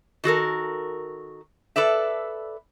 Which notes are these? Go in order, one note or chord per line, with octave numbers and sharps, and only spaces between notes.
D#3 F#4 A4 A#4
A4 B4 D5 E5